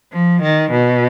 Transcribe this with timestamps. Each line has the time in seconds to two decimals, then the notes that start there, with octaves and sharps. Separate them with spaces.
0.13 F3
0.42 D#3
0.72 B2